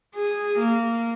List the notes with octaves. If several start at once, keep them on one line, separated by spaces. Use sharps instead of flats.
G#4
A#3